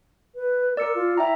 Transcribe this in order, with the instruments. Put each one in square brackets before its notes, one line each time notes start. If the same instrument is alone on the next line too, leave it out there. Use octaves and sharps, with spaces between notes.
[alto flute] B4
[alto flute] A#4 [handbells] D5 E6 C#7
[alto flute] F4
[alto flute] E4 [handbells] E5 G5 A#5